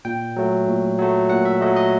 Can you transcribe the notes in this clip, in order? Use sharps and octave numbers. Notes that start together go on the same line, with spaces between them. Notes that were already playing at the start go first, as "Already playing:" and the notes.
A#2 G5
F#3 A3
A#2
F#3 A3
A#2 F#5
E5
F#3 A3 D#5
D#5